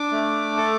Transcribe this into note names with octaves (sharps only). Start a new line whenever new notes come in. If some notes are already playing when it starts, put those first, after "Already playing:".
Already playing: D4 D6
A3
A4